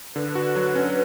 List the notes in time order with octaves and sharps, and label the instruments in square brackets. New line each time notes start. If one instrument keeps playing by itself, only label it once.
[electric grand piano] D3 [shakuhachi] B4
[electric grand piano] F#4
F#3
C#4